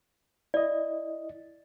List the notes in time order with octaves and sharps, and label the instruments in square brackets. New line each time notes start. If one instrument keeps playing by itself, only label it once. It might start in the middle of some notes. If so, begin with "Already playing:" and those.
[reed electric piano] E4 D#5 [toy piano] D5